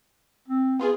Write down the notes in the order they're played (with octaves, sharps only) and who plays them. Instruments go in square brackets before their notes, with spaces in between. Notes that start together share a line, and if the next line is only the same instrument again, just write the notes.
[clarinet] C4
[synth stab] B3 F4 G#4